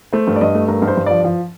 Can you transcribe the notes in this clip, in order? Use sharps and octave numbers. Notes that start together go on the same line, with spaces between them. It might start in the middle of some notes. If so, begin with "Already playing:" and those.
A3 C5
G2
D5
G2 D#5
A3
G2 A#4
G2
C5
G2
F3 D5
F3